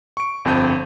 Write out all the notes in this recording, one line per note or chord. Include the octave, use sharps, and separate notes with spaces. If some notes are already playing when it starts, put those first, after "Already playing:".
C#6 D7
G1 F2 C4 A5 G6 D#7